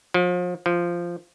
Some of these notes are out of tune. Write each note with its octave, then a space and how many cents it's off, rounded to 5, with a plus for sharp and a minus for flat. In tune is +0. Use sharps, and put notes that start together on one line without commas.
F3 +35
F3 -10